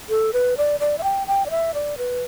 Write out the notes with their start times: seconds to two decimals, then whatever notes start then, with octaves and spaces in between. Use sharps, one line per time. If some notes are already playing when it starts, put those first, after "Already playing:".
0.09 A4
0.33 B4
0.57 D5
0.80 D5
0.98 E5
1.03 G5
1.27 G5
1.46 D5
1.50 E5
1.74 D5
1.98 B4